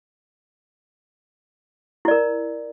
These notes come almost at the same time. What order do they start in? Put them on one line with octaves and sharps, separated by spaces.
E4 D5 A#4